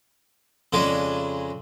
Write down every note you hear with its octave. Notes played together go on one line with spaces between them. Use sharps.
F2 C#3 G#3 D4